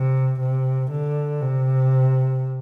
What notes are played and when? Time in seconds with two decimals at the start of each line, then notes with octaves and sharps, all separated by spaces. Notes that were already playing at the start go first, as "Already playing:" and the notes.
Already playing: C3
0.40 C3
0.90 D3
1.41 C3